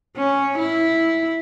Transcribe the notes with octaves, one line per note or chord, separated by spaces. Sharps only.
C#4
E4